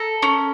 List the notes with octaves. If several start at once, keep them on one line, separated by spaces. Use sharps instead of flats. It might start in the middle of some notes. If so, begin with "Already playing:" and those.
Already playing: A4 A#5
C#4